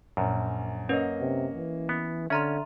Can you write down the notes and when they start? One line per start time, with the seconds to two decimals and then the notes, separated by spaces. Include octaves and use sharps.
0.17 A#1 F#2
0.89 A#3 C#4 B4 C#5 D#5
1.20 C3
1.55 E3
1.89 B3
2.30 D3 C#4 E5 A#5 C6 F6